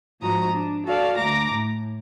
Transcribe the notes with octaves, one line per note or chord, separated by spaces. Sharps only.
G#2 F3 F#4 A#5 D#6
D4
F#4 A4 D5 F5
D2 A3 A#5 D6 A#6
A2